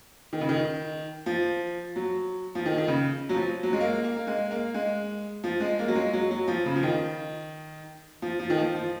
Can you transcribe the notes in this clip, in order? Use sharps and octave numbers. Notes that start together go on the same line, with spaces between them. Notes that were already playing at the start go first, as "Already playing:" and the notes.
D#3
C#3
D#3
F3
F#3
F3
D#3
D#3
C#3
F#3
F3
F#3
G#3
A#3
A#3
A#3
G#3
A#3
G#3
F3
G#3
A#3
F#3
G#3
F#3
F#3
F3
C#3
F3
D#3
F3
F3
D#3
F3
F3